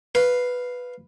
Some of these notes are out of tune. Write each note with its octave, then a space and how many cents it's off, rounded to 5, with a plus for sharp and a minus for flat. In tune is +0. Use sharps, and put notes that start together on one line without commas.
B4 +0 F5 +0